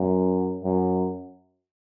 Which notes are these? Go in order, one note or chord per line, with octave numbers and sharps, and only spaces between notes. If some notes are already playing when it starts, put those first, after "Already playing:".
Already playing: F#2
F#2